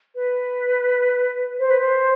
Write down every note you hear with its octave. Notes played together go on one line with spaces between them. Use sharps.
B4
C5
B4
C5